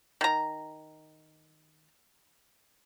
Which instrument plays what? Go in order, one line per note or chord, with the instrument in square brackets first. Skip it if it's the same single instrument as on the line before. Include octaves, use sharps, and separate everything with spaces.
[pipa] D#3 A#5